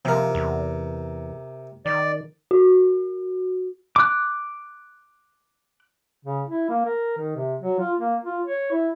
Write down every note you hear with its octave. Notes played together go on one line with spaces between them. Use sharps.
C3 F3 A#4
E2
D#3 D5
F#4
D6 F#6
C#3
E4
A#3
A#4
D#3
C3
F#3
F4
A#3
F4
C#5
E4